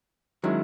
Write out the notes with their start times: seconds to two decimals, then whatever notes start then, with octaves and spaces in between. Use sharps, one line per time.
0.43 D#3 F#3 G#3 C#4 E4